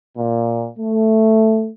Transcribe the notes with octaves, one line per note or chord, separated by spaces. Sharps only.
A#2
A3